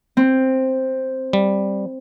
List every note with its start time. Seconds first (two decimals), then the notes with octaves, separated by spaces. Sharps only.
0.17 C4
1.33 G3